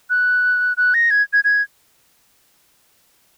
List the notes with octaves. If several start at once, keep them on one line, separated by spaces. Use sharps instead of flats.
F#6
F#6
A#6
G#6
G#6
G#6